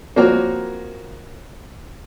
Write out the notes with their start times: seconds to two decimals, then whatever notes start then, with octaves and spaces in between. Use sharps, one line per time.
0.16 F3 A#3 C4 F#4 A#4 C#5